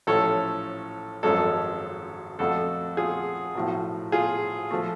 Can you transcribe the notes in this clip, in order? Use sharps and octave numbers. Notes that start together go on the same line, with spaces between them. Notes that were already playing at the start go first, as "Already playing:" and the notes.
A1 A2 F3 A3 A4 C#5
G#1 F#2 F3 G#3 A4 C#5
F2 F3 A3 F#4 A4
F4 G#4
B1 A2 F3
F4 G#4
F3 A3